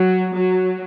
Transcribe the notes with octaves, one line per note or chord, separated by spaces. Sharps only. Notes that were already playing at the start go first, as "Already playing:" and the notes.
Already playing: F#3
F#3